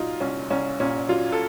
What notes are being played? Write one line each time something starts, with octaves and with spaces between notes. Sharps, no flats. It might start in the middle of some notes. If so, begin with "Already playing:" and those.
Already playing: C2 A#2 F#3 D#4 F4
C2 C#4
C2 C#4
A#2 C#4
F#3 F4
A4